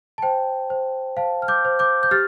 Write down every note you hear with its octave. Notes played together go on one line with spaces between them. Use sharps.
A5
C5 G5
C5
C5 F5 A5
F6
D6 G6
C5
D6 G6
G6
G4 F6 A6